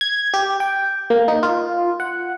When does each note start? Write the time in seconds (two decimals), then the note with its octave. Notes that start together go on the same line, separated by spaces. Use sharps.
0.01 G#6
0.34 G4
0.60 G5
1.10 A#3
1.28 D#4
1.43 F4
2.00 F#5